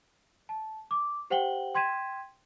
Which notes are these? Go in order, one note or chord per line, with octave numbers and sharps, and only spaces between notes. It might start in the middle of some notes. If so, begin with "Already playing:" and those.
A5
D6
G4 C5 F#5 G5 F#7 G7
G5 C6 G#6 B6 D#7 E7